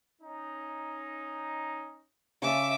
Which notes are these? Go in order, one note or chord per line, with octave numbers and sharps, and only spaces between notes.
C#4 D#4
C#3 E5 A5 D6